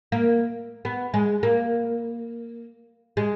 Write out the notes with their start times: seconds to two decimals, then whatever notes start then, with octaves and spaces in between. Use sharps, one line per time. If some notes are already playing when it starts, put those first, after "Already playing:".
0.12 A#3
0.85 B3
1.14 G#3
1.43 A#3
3.17 G#3